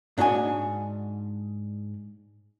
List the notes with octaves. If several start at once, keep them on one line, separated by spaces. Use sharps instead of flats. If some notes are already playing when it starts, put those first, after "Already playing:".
G#2 D4 F#4 D#5 G#5